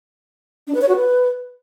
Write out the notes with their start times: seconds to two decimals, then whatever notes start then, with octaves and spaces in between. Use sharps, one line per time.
0.67 D4
0.74 B4
0.82 C#5
0.89 F#4
0.96 B4